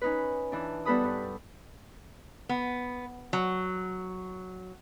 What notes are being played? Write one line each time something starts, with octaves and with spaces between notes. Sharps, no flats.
C#4 D#4 B4
E3 D4
G3 B3 A4 B4 B5 D#6
G2
B3
F#3